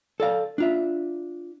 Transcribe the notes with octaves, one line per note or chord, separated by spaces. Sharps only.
A4 D5 F5
D4 F4 E5